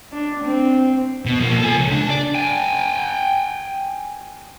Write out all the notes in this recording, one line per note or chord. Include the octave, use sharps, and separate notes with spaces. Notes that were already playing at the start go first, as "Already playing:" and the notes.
D4
C4
B2
F3 A#3
A4 G#5
C#3 G#3
D4
D5
G5 G#5